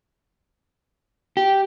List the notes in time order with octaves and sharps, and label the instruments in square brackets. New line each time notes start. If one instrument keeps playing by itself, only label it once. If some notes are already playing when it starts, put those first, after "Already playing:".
[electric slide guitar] G4